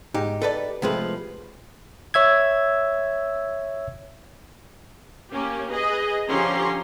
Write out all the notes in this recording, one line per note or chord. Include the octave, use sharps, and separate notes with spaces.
G#2 D#4 G4
A4 B4 D5
C3 F3 G#3 A3 B4
C#5 E5 E6 G#6
A#3 C#4 G4
G#4 B4 D#5
D3 F3 C#4 G4 A#5 C6